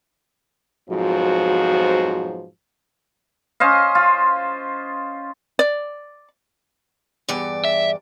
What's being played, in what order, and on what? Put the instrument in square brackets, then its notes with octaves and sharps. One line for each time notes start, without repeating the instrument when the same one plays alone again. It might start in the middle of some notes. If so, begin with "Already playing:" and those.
[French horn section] F2 G#2 B2 F3 F#3 F#4
[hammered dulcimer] C#4 C5 D#5 F5
F4
[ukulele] D5
[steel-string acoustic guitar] E2 G2 D5
[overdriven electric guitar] E5